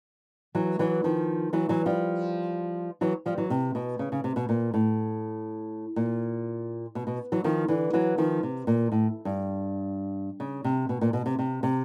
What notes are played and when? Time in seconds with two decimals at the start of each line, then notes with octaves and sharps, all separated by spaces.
0.55 E3 F#3
0.79 E3 F#3
1.04 D#3 F3
1.53 E3 F#3
1.69 E3 F#3
1.86 F3 G3
3.01 E3 F#3
3.26 F3 G3
3.38 E3 F#3
3.50 C3
3.75 B2
3.99 C#3
4.12 C#3
4.24 C3
4.36 B2
4.49 A#2
4.74 A2
5.96 A#2
6.95 B2
7.07 B2
7.32 E3 F#3
7.44 D#3 F3
7.68 D3 E3
7.93 E3 F#3
8.18 D#3 F3
8.43 C3
8.67 A#2
8.92 A2
9.25 G2
10.40 C#3
10.64 C3
10.89 B2
11.01 A#2
11.13 B2
11.26 C3
11.39 C3
11.63 C3